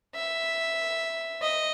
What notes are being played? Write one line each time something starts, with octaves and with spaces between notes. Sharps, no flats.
E5
D#5